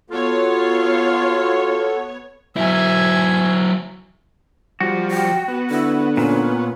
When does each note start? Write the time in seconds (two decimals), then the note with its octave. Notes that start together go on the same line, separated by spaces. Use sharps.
0.10 B3 F4 F#4 A4 C#5
2.56 F#3 E4 E5 G#5
4.80 F3 G3 F#4
5.11 G5
5.48 B3
5.70 D3 E4
6.17 A#2 C#4